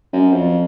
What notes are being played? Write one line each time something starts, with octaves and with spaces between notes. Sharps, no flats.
F#2
F2